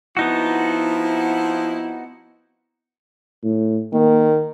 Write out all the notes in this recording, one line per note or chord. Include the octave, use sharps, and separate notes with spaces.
F3 B3 C4 D#4 E4 F#4
A2
D#3 A#3